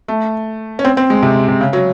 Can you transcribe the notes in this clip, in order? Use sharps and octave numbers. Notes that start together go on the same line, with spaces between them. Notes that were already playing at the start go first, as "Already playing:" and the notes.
A3
C#4
C4
C4
G#3
C3
C3
C#3
F#3